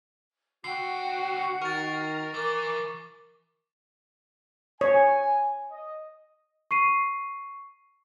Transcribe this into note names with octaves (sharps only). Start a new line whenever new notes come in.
D3 F#4 G5 C7
D#3 A#4 C#6 A6
E3 A#4 D6 A6
C#5 G#5
D#5
C#6 C7 D#7